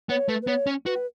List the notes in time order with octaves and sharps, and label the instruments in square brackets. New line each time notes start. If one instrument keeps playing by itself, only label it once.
[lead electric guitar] B3 [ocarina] C#5
[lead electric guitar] A3 [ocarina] B4
[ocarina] B4
[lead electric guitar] B3 [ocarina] C#5
[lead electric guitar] C#4
[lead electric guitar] F#4 [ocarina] B4